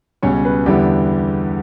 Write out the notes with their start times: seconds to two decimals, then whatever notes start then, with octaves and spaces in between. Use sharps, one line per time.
0.23 C#2 B2 G3 C#4 C#5
0.45 B4
0.66 E2 D3 G3 B3 E4 G4